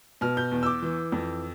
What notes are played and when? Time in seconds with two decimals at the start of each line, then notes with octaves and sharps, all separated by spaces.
0.21 B2 F6
0.37 G6
0.51 E2
0.63 E6
0.66 D6
0.82 E3
1.12 F2